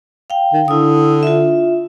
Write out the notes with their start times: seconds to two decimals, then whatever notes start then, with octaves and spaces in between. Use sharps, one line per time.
0.30 F5 G5
0.53 D#3
0.68 D3 E4 D#6
1.23 F4 E5